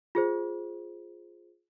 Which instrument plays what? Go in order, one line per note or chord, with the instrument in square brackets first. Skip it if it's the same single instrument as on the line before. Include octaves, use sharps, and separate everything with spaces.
[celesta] F4 G#4 C5